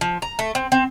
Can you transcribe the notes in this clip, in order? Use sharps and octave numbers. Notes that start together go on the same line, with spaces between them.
F3
A#5
A3
C4
C4